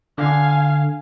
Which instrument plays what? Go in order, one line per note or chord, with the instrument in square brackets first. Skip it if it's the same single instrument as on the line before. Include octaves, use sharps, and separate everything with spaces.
[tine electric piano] D3 [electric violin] F5 G#5